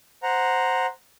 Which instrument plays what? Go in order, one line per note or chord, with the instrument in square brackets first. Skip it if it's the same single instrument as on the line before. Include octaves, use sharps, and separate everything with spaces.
[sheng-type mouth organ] C5 F#5 A#5